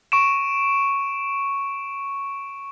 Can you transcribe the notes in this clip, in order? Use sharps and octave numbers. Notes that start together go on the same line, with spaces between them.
C#6 D7 E7